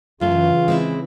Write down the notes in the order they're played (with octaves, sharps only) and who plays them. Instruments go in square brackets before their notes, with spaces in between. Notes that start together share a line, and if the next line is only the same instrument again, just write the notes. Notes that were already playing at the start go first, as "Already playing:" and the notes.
[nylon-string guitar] F#2 A3 [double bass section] C#3 E3 [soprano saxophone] F4
[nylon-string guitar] G#3 C4 E4